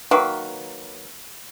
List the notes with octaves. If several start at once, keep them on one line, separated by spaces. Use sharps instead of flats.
D#3 F#3 A#3 B4